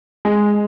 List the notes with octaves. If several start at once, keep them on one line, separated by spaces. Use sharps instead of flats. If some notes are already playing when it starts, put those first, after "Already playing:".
G#3